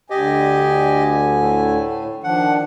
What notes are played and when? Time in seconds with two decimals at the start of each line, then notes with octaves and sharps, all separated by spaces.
0.10 D2 D3 G4 D#5 G#5
1.41 A2
2.24 D#3 F3 D4 F#5